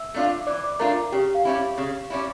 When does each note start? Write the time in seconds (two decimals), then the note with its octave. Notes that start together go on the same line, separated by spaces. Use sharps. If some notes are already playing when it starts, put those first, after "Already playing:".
Already playing: E5 E6
0.14 A3 D4 F4
0.47 E3 D5 D6
0.64 D5 D6
0.79 A3 D4 F4 A#4 A#5
0.96 A#4 A#5
1.12 C#3 G4 G5
1.35 F5
1.45 G3 C#4 E4
1.78 C#3
2.10 G3 C#4 E4